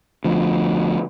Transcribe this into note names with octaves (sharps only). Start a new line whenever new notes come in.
D2 F3